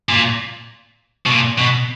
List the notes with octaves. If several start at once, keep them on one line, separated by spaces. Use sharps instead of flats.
A#2
B2
A#2
B2